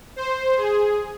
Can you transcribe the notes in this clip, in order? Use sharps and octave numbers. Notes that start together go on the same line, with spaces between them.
C5
G#4